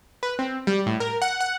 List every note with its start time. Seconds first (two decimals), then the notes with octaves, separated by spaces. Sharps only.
0.23 B4
0.39 C4
0.67 G3
0.86 A2
1.00 A#4
1.22 F#5
1.41 F#5